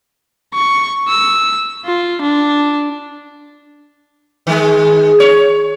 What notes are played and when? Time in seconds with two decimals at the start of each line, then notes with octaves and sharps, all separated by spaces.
0.54 C#6
1.09 E6
1.86 F4
2.22 D4
4.47 D#3 G#3
5.20 C#5